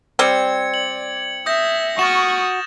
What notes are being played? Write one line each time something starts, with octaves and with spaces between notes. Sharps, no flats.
G3 C4 G#6 C#7
D5 F#7
E5 D#6 G6 A#6
F#4 C#6 D#6 F6 A6 E7